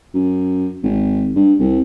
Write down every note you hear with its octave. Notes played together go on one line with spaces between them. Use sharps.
F#2
G#1
G2
C2